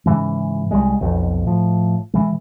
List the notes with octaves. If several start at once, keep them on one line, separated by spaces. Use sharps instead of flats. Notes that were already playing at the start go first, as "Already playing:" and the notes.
G#2 C#3 E3 G#3
C2 F2 G3 G#3
B1 F2 B2
A2 F3
B2 E3 G#3